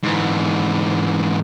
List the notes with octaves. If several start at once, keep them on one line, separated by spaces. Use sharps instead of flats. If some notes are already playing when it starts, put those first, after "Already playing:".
G#2 E3